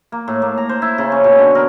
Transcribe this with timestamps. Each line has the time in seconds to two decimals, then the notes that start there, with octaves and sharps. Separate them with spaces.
0.12 A#3
0.28 A2
0.42 A#3
0.58 A#5
0.69 C5
0.82 E4
0.98 C#3
1.12 C#4
1.24 B2
1.39 D3
1.55 A#4